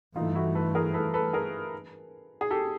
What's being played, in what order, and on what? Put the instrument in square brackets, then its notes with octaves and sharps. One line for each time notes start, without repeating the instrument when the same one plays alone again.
[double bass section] G2 E3 A3 [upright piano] D#4 F4
[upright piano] E4 F#4
A4 B4
G#4 A#4
A4 B4
A4 B4
G#4 A#4
G#4
G4 A4